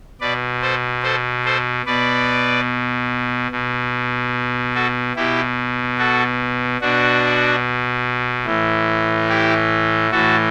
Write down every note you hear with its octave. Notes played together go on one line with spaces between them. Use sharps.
B2 B4 D5
A4 C5
A4 C5
A4 C5
B2 B4 D5
B2
F#4 A4
B2 E4 G4
F#4 A4
B2 D4 F#4
A2 E3
E4 G4
A2 E3 F#4 A4